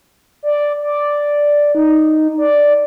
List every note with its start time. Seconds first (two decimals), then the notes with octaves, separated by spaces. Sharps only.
0.43 D5
0.82 D5
1.75 D#4
2.38 D5